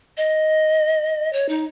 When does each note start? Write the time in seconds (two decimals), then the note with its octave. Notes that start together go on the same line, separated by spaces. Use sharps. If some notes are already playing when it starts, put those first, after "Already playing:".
0.17 D#5
1.33 C#5
1.49 D#4